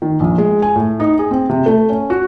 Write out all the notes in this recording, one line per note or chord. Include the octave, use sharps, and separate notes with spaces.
D#3
A#1
G#3
G#5
A2
D#4
G#4
C4
C3
A3
C#4
F#4